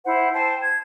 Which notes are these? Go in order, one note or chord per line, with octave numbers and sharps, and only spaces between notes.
E4 C5 F#5
C5 G5 A5
G#6